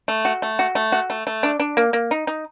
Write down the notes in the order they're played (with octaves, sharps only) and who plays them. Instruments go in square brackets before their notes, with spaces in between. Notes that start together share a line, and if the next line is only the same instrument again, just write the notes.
[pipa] A3
F#4
A3
F#4
A3
F#4
A3
A3
D4
D4
A#3
A#3
D#4
D#4